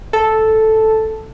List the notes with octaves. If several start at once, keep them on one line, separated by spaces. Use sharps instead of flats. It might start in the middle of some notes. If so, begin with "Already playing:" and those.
A4